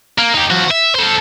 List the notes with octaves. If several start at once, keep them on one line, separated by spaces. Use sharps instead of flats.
A#3
D#4 G4
F3 F#4
E5
A4 C5